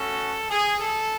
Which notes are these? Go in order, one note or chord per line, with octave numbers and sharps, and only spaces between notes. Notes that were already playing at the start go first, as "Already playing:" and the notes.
Already playing: A3 C#4 F#4 A4
G#4
A4